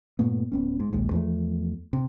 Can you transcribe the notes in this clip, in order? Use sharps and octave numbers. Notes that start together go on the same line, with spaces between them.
G2 A#2 A3 B3
D1 B3 C#4
G#2
A#1 D#2 G#2
E2 F3 A3
C3